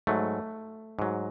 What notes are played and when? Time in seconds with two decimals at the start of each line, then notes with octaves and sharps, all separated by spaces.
0.07 G#2 F#3 A3
0.99 G#2 F#3